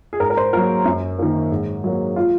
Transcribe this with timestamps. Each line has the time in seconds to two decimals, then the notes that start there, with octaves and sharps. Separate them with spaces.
0.13 G#4
0.20 G#2 A#4
0.30 A#4
0.37 C5
0.53 F#3 A#3 A#4
0.85 F#2
1.19 D#3 A#3
1.52 G#2
1.84 F#3 A#3
2.16 F4